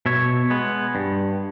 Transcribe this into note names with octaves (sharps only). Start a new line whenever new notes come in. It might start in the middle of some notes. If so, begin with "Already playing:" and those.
B2 C#5 E5
G#3 B3
G2